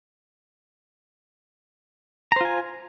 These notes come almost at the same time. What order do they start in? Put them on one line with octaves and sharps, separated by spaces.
A#5 C5 F4 G#5